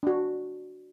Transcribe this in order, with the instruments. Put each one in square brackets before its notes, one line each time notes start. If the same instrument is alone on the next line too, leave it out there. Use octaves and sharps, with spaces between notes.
[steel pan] D4 F#4